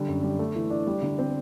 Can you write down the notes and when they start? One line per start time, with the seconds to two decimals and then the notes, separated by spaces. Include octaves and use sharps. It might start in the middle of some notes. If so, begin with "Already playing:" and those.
Already playing: D3 G3
0.08 F#2
0.23 G3
0.39 A3
0.56 E3
0.70 D4
0.87 G3
1.02 D3
1.18 C4